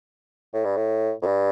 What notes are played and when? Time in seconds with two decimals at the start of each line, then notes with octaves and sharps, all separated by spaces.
0.54 A2
0.65 G2
0.77 A2
1.22 F2
1.27 G2